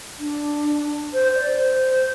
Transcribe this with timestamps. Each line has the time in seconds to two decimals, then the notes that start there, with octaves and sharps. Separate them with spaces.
0.18 D4
1.13 C5
1.34 D5
1.54 C5